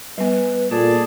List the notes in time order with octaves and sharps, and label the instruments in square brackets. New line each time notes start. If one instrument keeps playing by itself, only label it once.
[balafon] G3 B3 [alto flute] B4
[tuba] A#2 [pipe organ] G#4 D5 A5 [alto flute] A4